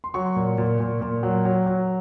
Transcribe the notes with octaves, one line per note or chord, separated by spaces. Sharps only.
C6
F#3 C#6
A#2
A#2
A#2
A#2
F#3
F#3
F#3